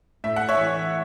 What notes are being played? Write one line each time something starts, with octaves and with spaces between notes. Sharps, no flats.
A2 E5
F#5
C#5 E5
E3